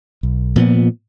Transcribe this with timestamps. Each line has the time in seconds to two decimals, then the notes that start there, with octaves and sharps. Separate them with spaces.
0.23 B1
0.56 A#2 F3 B3